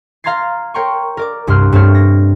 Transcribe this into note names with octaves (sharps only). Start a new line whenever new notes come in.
F5 A#5 C6 G#6 A6 C7
A#4 C#5 G5 A#5 C6 C#6
A#4 D5 D6
C2 G2 A#3 C6 F6 F#6
G2 A3 C4 A4 C#5 F6
A#6